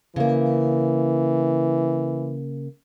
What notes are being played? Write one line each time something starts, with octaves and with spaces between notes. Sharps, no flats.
C#3 E3 A#3